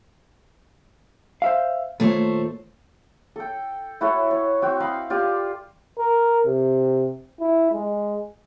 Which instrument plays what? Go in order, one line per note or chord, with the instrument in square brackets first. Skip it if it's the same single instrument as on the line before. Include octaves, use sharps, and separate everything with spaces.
[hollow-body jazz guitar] C5 E5 F5
[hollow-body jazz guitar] D#2 A#2 C#5 [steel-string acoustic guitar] A3 C5
[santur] A4 G5
E4 F#4 A4 C#5
C#5
C4 F#4 G5
D#5 F5 B5 C6
F4 G4 D5
[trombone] A#4
C3
E4
G#3